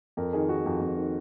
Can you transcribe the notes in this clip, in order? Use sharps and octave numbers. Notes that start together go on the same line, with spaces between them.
F2 A#4
D#3 G#4
D#3 F#4
F2
F2
D#3